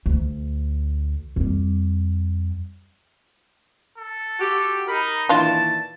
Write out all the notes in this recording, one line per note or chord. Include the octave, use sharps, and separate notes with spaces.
D2
F2 G3
A4
F#4 G4
D#4 A#4 B5
A#2 D#3 E3 D4 F4 A5